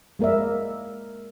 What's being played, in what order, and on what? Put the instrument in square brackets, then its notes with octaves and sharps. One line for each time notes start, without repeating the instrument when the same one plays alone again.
[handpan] G#3 A#3 A#4 D5 E5